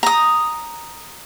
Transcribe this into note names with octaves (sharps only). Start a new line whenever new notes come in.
A#5 D#6